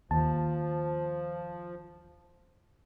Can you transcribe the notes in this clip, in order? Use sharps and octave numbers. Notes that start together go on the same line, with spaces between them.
D#2 F3 A5